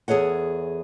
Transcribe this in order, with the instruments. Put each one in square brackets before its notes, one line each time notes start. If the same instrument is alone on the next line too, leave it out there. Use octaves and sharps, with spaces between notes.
[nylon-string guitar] E2 G#4 A4 C#5 F#5